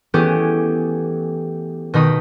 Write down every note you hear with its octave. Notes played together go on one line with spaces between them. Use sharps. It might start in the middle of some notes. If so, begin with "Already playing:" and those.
E3 A3 B3 C#4 G4 G#4
B2 D#3 D#4 B5 D#6